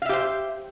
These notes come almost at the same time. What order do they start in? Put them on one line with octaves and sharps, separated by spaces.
F5 E5 G4 C5